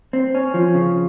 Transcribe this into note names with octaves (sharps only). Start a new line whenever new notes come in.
C4
C#4
F3
C#3